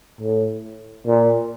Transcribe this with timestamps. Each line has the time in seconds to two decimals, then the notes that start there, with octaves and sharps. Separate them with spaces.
0.21 A2
1.06 A#2